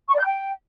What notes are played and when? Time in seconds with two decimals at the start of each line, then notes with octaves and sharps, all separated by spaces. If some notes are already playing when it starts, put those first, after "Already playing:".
0.08 C#6
0.14 D5
0.19 G6
0.24 G5